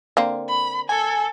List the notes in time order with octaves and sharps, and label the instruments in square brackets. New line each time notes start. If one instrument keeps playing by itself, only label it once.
[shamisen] D3 A#3 C4
[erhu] B5
[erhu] A4 [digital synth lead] G#5